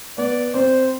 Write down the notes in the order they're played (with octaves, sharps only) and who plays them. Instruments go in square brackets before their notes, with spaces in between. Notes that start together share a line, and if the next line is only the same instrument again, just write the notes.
[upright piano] B3 [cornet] D5
[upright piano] C4 [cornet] C5